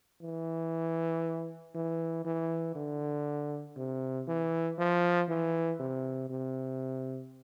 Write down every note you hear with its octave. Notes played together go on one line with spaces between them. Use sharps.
E3
E3
E3
D3
C3
E3
F3
E3
C3
C3